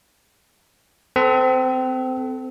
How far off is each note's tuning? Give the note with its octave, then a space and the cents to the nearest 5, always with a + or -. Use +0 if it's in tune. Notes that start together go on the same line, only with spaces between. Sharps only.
C4 -25 A4 +0